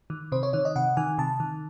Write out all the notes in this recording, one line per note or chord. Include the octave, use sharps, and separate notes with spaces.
D#3
C3 C5
C#5
D#3 C#5
D#5
C3 F#5
D#3 G#5
C3 A5
D#3